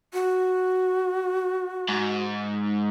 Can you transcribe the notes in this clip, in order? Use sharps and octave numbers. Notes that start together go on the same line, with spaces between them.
F#4
G#2